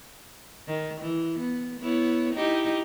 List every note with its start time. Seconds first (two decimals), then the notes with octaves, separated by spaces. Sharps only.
0.67 D#3
1.01 E3
1.39 B3
1.80 B3 E4 C#5
2.34 D#4 E4 G4